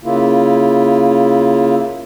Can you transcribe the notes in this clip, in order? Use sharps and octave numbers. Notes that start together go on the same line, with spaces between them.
C#3 A#3 E4 F4